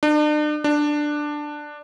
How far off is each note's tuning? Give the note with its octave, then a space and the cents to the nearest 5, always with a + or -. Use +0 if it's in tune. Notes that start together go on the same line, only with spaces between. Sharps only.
D4 +40
D4 +10